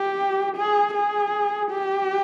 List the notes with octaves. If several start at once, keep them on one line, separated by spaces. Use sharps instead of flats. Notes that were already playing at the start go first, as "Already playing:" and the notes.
Already playing: G4
G#4
G#4
G4